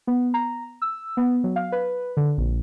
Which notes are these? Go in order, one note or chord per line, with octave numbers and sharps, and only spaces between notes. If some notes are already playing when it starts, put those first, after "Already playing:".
B3
A#5
E6
B3
F#3
F5
B4
D3
A#1